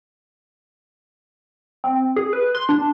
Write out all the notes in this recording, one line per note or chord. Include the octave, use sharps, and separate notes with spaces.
C4
G#4
B4
C6
D4